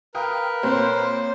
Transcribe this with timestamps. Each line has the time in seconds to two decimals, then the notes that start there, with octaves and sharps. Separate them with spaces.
0.15 A#4 B4 F5 G5 D#6
0.63 A#2 C4 C5 C#5